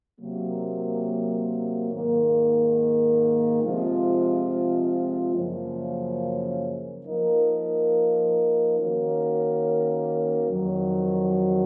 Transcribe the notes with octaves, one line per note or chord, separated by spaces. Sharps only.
C3 F#3 A#3
G#2 D#3 A#3
C3 F3 G#3 C4 F4
F#2 C#3 F3 A#3 C#4
F3 A#3 D#4 A#4
D#3 A#3 C#4 F#4 A#4
F2 D#3 F#3